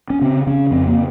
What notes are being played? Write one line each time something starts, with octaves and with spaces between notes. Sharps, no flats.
C#4
C#3 C4
C#3 C#4
F2 C4
A#3